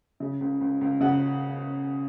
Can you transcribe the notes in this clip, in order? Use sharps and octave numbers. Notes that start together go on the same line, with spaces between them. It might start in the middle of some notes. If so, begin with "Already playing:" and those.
C#3
C#2
C#2
C#2
C#3 F#5